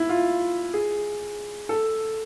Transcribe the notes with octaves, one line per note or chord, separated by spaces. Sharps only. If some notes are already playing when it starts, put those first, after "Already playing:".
Already playing: E4
F4
G#4
A4